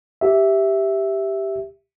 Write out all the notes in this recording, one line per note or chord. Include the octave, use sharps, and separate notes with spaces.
G4 E5